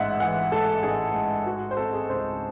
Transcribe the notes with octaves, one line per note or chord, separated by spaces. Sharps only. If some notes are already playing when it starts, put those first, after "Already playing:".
Already playing: A1 G#2 G#3 E5 F#5
E3 F#5
G#3 A4
A1 G#4
G#2
G#3 F#4
C5
C4 A4
G#4
C#2 C5